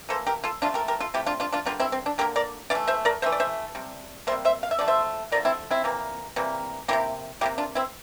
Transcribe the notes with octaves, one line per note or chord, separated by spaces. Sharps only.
E3 A#3 A4 C5
G4 A#4
F4 A4
C3 F3 A3 D4 F4
G4 A#4
G4 A#4
F4 A4
C3 F3 A3 E4 G4
D4 F4
D4 F4
D4 F4
D3 G3 A#3 D4 F4
C4 E4
C4
D4
D3 G3 A#3 G4 A#4
A#4 D5
E3 A3 D5 F5
C5 E5
A#4 D5
E3 A3 C5 E5
D5
C5 E5
C3 G3
C3 G3 A#3 C5 E5
C5 E5
F5
E5
D3 F3 A3 D5
C5 E5
D3 F3 A3 A#4 D5
C4 E4
C4 E4
C3 E3 G3 A#3
C3 E3 G3 A#3
C3 G3 A#3 E4 G4
C3 G3 A#3 E4 G4
D4 F4
C4 E4